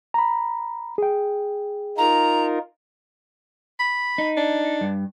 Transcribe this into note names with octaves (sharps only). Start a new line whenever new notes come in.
A#5 B5
G#4 G5
D#4 F4 A#4 A#5
B5
D#4
D4
G2